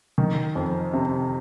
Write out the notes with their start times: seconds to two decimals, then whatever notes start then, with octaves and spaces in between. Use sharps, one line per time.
0.18 D#3
0.55 F2
0.93 C3